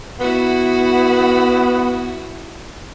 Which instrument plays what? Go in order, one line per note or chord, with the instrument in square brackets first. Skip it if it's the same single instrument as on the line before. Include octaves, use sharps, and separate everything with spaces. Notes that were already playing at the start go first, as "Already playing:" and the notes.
[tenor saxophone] B3 [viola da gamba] E4 F#4